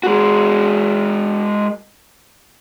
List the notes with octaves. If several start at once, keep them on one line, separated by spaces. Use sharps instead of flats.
G#3 F#4